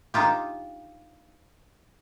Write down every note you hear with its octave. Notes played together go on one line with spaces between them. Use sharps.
D4 D#4 F4 G4